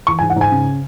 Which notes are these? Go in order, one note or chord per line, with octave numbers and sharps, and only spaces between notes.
E3 C#6
G#5
G#2
F#5
G#2 G#5
C#3